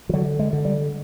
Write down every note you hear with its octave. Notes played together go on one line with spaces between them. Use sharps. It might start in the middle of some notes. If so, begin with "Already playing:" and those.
F3
D3 F#3
G#3
D3
G3